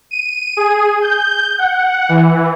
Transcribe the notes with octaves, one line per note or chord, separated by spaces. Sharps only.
D#7
G#4
G6
F#5
E3